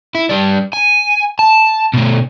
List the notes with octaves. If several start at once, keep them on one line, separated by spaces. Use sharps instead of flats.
E4
G3 D4
G#5
A5
B2 A3